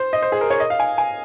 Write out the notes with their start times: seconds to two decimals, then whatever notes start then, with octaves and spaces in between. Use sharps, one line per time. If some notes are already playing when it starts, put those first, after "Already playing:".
Already playing: C5
0.13 D#5
0.22 C5
0.32 G#4
0.41 A#4
0.50 C#5
0.60 D#5
0.70 F5
0.80 G#5
0.98 G#5